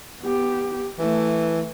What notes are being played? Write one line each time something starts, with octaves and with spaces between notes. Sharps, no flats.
B3 G4
E3 A3